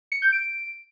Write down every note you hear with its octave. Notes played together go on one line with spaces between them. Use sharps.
C#7
G6
D7